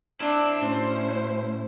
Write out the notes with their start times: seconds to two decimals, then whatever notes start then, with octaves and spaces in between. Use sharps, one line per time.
0.20 C4 D4 E4
0.61 A2 C#4 E4 F#4 C5